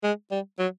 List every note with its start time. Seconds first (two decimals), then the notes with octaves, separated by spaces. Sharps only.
0.03 G#3
0.31 G3
0.59 F#3